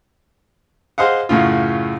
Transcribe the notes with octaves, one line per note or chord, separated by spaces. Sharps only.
G#4 C5 D#5 F5 F#5
F#2 A2 C#3 F4